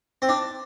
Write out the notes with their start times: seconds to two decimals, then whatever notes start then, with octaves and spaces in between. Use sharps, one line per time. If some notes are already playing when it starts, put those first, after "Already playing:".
0.22 C4
0.29 D4